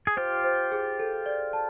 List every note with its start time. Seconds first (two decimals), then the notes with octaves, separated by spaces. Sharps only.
0.07 G#4
0.16 F4 G4 C5
0.44 C5
0.72 G#4
0.99 A4
1.26 D5
1.53 A5